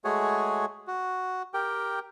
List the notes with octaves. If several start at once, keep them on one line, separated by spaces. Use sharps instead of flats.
G#3 A3 F#4 G#4 C#5 G#5
F#4
G4 A#4 G5